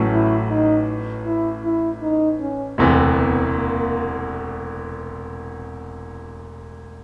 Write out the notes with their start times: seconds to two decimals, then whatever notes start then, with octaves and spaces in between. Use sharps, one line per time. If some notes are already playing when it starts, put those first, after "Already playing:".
Already playing: A1 A2 F#3 A3 C#4
0.12 E4
0.50 D#4
1.26 E4
1.64 E4
2.02 D#4
2.40 C#4
2.78 E1 D2 C3 E3 C4
3.16 B3
3.54 A#3